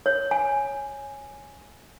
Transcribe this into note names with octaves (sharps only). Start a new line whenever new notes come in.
C#5
G#5